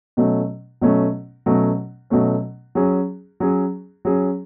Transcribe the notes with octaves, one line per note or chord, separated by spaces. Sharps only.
B2 F#3 A3 C#4
B2 F#3 A3 C#4
B2 F#3 A3 C#4
B2 F#3 A3 C#4
F#3 C#4 G#4
F#3 C#4 G#4
F#3 C#4 G#4